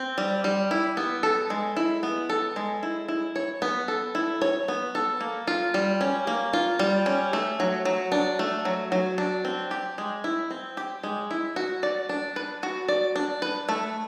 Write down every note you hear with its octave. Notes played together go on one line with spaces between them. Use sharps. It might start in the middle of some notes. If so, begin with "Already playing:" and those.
Already playing: C4
G3
G3
E4
B3
A4
G#3
E4
B3
A4
G#3
E4
E4
C#5
B3
A4
E4
C#5
B3
A4
A#3
F4
G3
C#4
A#3
F4
G3
C#4
A3
F#3
F#3
D4
A3
F#3
F#3
D4
C4
G4
G#3
E4
C4
G4
G#3
E4
F#4
D5
D4
B4
F#4
D5
D4
B4
A3